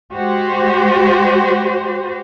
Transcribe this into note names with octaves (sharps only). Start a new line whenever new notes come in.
G#3 F#4 G4 C5